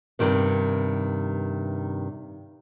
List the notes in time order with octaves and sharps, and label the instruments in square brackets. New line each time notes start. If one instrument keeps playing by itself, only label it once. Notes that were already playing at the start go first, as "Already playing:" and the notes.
[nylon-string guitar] G2 C3 D#3 B3